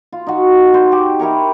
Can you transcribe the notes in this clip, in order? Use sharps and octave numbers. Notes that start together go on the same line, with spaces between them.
F4
D#4 F#4
C5 D#5
G4
E4 G4 A#4 C#5